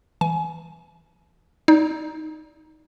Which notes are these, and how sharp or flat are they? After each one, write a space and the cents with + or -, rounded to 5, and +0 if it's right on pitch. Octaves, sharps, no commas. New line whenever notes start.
E3 +0 G#5 +25
D#4 +10 D5 +0